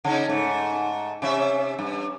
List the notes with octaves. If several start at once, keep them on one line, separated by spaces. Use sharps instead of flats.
C#3 C#4 D#4
G#2 A3
C3 C#4 E5
G2